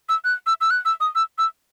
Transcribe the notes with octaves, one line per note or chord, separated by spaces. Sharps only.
E6
F#6
E6
E6
F#6
E6
D#6
E6
E6